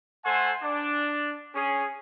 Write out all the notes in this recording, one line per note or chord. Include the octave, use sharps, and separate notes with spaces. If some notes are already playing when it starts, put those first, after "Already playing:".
A3 A4 C5 F#5 G#5 C6
D4
C#4 G#4